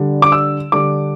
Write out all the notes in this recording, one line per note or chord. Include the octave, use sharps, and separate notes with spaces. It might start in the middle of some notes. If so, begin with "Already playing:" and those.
Already playing: D3 G3 D4
D6
E6
D3 G3 D4 D6